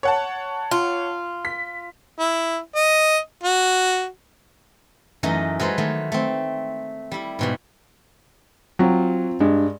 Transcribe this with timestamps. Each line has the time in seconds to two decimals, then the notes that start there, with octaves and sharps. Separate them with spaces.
0.03 C#5 F#5 A5
0.71 F4
1.45 B6
2.19 E4
2.75 D#5
3.43 F#4
5.23 F#2 E3 A3 D#4 D#5 A#5
5.60 F#3 G#3 A4 B4 C5
5.78 D#3 F#3 A3
6.12 A3 C4
7.11 G3 E4
7.39 G#2 B2 G3
8.79 F#3 C4 F4
9.40 G2 G#3